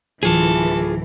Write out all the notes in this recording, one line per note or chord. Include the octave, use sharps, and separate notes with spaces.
D1 E3 F4 G#4 A4